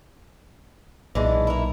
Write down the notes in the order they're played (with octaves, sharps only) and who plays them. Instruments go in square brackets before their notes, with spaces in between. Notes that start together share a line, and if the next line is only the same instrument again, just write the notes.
[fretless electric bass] B1 A#2 [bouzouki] E3 G#3 D4
[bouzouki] E4 A#4